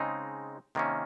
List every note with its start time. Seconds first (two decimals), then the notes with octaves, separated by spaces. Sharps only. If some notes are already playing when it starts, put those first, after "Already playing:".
Already playing: C#3 G#3 C4 D#4
0.75 C3 D#3 A#3 C#4